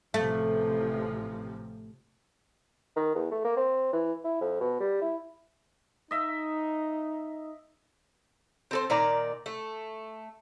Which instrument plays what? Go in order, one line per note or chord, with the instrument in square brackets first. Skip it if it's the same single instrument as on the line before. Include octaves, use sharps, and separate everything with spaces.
[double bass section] A1 C3 F3 [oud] A3
[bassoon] D#3
E2
A3
A#3
C4
E3
E4
F2
B2
G3
E4
[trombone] D#4 [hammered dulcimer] D#5 E5
[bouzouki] C4 A4 C5
A#2 D#3 D5 A#5
A3